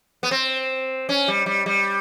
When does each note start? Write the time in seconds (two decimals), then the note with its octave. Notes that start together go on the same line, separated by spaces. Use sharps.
0.23 B3
0.31 C4
1.09 C#4
1.28 G3
1.46 G3
1.66 G3